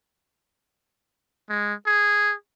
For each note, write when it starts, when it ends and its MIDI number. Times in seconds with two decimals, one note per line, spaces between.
1.49 1.74 56
1.87 2.34 68